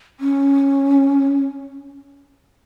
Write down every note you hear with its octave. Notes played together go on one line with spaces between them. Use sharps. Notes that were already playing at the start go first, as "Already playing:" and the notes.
C#4